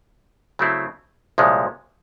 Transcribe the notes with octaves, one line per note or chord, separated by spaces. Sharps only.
C#3 F#3 A3 C4 E4
C2 A#2 F3 G#3 C#4